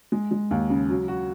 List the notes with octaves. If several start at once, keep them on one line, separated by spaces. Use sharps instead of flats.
G#3
G#3
D#2
C#3
F#3
F#4